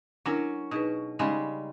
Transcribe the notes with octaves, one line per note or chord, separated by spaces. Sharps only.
F#3 C#4 D4 E4 A#4
B2 D#4 G#4 B4
C#3 G3 G#3 D#4